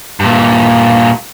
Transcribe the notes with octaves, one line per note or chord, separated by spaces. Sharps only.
G2 A#2